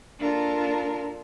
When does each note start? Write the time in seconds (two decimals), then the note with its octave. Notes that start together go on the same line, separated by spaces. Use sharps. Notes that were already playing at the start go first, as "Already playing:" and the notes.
0.19 A#3 D4 F4 A4 A#4